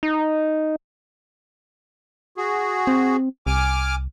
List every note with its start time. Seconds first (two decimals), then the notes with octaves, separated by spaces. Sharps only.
0.03 D#4
2.37 F#4 G#4
2.87 C4
3.47 C2 G#5 D6 F6